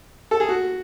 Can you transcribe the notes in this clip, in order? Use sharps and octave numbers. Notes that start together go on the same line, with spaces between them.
A4
G#4
F#4